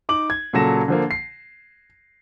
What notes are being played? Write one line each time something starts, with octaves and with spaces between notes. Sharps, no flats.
D#4 D6 F#7
G#6
A#2 C#3 F#3 A4 A#6 E7
D3 F3 A#3
C7